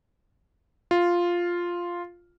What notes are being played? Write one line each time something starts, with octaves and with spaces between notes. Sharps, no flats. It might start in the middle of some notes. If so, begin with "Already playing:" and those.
F4